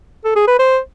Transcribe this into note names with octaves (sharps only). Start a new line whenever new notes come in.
A4
G#4
B4
C5